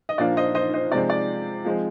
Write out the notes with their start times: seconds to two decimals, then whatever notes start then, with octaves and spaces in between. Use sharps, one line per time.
0.09 D#5
0.18 A#2 F3 A#3 D4 D5
0.37 C5 D#5
0.55 C5 D#5
0.74 C5 D#5
0.92 C3 F3 G#3 C4 D5
1.10 D5
1.65 F3 G#3 C4